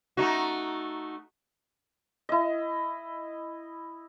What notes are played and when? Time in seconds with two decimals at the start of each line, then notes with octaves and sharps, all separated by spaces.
0.17 A3 D#4 F#4
2.29 E4 D#5